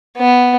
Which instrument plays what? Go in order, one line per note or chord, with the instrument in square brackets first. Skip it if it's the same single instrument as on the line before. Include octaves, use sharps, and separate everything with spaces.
[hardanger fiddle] B3